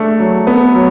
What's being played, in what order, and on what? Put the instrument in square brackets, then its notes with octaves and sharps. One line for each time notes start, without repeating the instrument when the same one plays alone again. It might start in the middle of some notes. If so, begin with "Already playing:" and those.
Already playing: [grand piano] A3 D4
F#3
B3
F#3